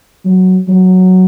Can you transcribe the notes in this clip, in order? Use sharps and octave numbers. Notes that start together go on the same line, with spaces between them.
F#3
F#3